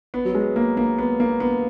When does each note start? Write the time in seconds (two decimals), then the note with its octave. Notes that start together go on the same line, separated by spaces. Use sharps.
0.14 B3
0.25 F#3
0.35 G#3
0.56 A#3
0.77 A#3
0.98 B3
1.20 A#3
1.40 B3